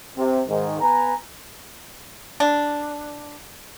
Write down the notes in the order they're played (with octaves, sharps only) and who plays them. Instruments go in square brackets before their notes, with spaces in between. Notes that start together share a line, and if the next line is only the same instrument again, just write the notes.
[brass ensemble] C3
G#2 D#3
B3 B4 G#5 A#5
[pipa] D4